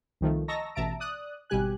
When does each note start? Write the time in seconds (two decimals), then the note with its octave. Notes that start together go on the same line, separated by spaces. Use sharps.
0.21 C2 D#3 F3 A3
0.48 D#5 A5 A#5 C#6 E6 A#6
0.75 A1 B2 E5 A5 A#5 D7
0.99 D5 D#6 F#6
1.50 G#1 B2 G3 G4 G#5 F#6